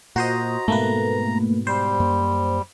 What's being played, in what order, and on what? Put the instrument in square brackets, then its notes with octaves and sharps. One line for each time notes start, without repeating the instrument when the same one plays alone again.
[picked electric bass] A#2 [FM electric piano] F#4 C5 D#5 [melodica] A#5
[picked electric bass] G#2 B2 [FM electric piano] A3 A#3 B4
[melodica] G3 [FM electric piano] C5
[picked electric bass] F#2 A#3